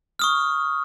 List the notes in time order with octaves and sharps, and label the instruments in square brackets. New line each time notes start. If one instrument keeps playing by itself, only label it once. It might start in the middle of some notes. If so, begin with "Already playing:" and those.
[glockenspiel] C#6 D#6 F6